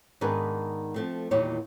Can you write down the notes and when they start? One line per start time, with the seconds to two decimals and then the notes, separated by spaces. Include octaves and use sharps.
0.21 G#2 D#3 B3 D4 G#4 B4
0.94 F3 A3 C4
1.31 E2 A#2 D#3 G3 C#5